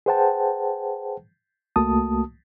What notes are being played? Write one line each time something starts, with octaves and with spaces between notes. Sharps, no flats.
G#4 B4 C5 F#5 G5 A5
C2 A3 A#3 F#4 A5 D#6